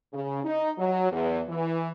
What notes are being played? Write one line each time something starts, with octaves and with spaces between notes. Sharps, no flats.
C#3
D#4
F#3
E2
E3